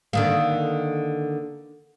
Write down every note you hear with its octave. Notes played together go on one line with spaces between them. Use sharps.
D3 D#3 A#3